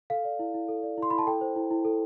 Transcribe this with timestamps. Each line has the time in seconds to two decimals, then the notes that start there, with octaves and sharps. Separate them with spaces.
0.10 A4 F5
0.25 D5
0.39 E4
0.54 E4
0.69 A4
0.83 D5
0.98 E4 C6
1.10 E4 B5
1.18 A5
1.27 A4 G5
1.41 C5
1.56 E4
1.71 E4
1.85 A4